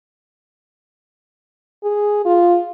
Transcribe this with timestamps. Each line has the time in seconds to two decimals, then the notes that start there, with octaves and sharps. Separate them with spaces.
1.84 G#4
2.26 F4